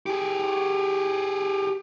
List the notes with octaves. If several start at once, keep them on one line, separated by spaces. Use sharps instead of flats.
G4 G#4